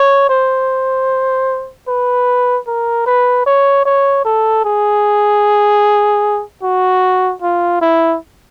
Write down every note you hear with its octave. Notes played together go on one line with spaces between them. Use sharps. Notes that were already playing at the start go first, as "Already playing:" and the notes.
Already playing: C#5
C5
B4
A#4
B4
C#5
C#5
A4
G#4
F#4
F4
E4